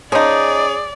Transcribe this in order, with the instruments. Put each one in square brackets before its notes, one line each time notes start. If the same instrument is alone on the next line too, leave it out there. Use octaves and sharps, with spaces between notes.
[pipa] F3 D#4 [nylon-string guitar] C#4 [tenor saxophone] G#4 [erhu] D5